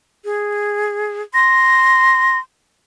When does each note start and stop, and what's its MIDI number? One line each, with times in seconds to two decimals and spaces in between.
0.25 1.22 68
1.34 2.40 84
1.34 2.38 94